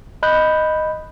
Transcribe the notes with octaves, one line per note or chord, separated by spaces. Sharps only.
D#5 B5 F#6 G6